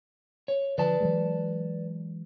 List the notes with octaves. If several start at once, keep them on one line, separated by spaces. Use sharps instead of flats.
C#5
D3 F3 B4 D5 A5
E3 F#3 G#3